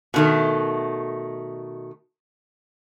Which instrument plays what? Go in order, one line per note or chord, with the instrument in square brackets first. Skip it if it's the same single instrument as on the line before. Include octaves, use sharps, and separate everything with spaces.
[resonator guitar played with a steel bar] B2 D#3 A3